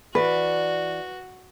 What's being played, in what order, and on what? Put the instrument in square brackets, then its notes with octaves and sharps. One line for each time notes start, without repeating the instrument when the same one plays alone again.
[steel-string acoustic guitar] E3 D5 [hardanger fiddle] F#4 [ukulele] B4